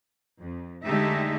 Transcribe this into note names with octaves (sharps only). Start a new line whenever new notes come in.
F2
D3 G#3 A3 D#4 G4 E5